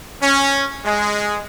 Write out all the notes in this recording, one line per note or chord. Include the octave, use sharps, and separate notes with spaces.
C#4
G#3